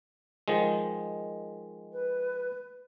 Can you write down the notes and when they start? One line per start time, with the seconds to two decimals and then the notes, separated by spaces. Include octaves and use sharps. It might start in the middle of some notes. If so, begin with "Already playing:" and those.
0.48 D#3 F3 G#3
1.92 B4